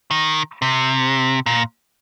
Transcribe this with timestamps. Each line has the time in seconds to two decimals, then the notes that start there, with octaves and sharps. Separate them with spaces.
0.11 D#3
0.62 C3
1.46 A#2